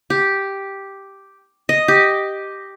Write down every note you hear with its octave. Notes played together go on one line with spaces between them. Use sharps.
G4
D#5
G4